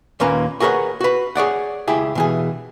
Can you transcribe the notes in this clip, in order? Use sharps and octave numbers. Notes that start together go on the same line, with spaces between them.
D#2 A#2 A#3 C#4 B4 A#5
F#4 G#4 A#4 B4 C#5 F#5
F#4 B4
G#4 C#5 D5 F#5
C#2 E4 G4 G#4
B2 E3 G#4